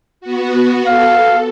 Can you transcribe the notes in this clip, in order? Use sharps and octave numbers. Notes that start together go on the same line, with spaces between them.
B3 F#4
A4 F5